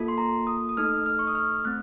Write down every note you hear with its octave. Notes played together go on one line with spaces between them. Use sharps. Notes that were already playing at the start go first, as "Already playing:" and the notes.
Already playing: A#3 F4 A4
C6
A#5
D#6
D#6
A3 D#4 A4 F6
F6
C#6
D#6
F6
A3 C4 F#6